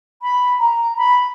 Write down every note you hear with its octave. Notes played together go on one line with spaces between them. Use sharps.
B5
A#5
B5